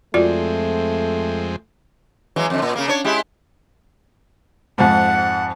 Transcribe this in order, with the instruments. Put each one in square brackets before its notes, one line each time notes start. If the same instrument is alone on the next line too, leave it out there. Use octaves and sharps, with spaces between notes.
[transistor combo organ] F2 G#3 C4 [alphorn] A3 [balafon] F4 F#4 D5
[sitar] E3 F#3 G#3
F2 D3
A#2
C#3 A#3
D4 C#5
G#3 E4 G4
[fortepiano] F2 G#2 [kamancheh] F#5